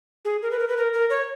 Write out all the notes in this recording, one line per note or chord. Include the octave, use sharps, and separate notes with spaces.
G#4
A#4
B4
A#4
B4
A#4
A#4
C#5